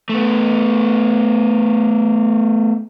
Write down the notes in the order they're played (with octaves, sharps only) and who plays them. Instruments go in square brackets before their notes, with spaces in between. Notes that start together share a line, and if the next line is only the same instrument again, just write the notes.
[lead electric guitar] A3 B3